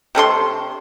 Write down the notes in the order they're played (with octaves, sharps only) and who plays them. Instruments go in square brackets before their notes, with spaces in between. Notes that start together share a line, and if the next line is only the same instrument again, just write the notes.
[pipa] C3 A3 E4 C6